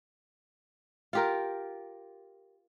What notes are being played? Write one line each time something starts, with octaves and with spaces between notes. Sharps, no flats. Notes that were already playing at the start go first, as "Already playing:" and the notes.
F4 G4 A#4